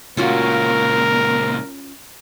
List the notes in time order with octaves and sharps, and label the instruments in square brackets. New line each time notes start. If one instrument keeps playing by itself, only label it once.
[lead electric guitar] C#2 A#2 [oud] C#4 F4 F#4 [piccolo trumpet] A#4